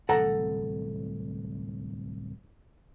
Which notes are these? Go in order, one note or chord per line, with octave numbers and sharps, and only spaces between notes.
D1 C2 E3 A4 F#5 A#5